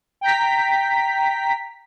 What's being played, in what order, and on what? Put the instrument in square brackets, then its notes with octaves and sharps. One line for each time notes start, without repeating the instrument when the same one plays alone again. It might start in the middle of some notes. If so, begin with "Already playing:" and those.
[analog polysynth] G5 A#5 B6